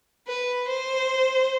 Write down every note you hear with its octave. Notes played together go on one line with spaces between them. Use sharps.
B4
C5